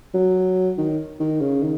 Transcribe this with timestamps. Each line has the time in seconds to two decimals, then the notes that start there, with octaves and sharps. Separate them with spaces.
0.14 F#3
0.78 D#3
1.20 D#3
1.41 C#3
1.62 D#3